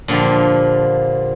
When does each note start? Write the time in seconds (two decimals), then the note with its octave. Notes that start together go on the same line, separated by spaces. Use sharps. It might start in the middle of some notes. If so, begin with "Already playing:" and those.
0.08 A#2 D3 F3 G3